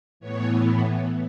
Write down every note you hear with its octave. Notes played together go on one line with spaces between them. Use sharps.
A2 E3 B3 C#5